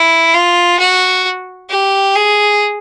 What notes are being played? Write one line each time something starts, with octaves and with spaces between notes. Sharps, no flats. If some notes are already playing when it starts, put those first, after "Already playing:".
Already playing: E4
F4
F#4
G4
G#4